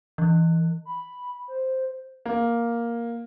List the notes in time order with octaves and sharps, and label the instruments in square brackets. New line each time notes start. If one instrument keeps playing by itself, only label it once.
[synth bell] E3
[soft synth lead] B5
C5
[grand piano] A#3